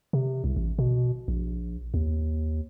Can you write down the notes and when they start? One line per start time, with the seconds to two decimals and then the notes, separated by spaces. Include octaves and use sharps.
0.13 C3
0.44 C2
0.57 A1
0.79 B2
1.28 A#1
1.94 D#2